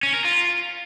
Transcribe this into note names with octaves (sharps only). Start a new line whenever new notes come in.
C#4
A#4
F4